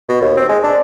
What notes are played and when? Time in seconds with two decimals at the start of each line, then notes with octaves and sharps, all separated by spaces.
0.08 B2
0.21 D#2
0.37 C4
0.49 G#3
0.63 D4